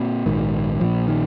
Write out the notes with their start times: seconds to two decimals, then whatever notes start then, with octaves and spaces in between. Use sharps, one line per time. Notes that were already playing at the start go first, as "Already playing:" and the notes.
Already playing: A#2 C4
0.26 A#1 G#2 D#3
0.80 A#1 A#2 F3
1.08 D#3